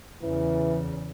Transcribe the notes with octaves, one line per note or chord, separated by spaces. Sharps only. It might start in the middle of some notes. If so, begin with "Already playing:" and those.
E2 C#3 E3